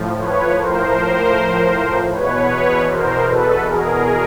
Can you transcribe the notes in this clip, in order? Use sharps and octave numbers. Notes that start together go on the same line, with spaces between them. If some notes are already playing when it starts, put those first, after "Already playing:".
Already playing: A2 F3
B4 C#5
A#4 C5
E2 B2 B4 C#5
A#4 C5
A4 B4
G#4 A#4